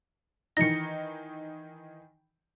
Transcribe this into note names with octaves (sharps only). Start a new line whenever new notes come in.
D#3 E3 D#4 A#6 C#7